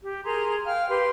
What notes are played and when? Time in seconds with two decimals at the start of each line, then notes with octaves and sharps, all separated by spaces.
0.03 G4
0.25 G#4 A#4 A#5 C6
0.66 F5 G5 F6
0.89 G4 B4 C6